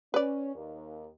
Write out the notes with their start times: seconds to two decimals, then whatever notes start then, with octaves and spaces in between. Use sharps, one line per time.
0.14 C#4 B4 D5
0.55 D#2